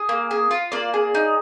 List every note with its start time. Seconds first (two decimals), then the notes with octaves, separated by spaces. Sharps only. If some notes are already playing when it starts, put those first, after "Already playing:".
Already playing: G#4
0.09 A#3
0.31 G#4
0.51 F4
0.72 A#3 D5
0.94 G#4
1.15 D#4